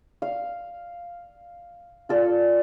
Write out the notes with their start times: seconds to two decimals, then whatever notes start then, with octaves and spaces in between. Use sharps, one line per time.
0.22 F5
2.09 F4 A4 D5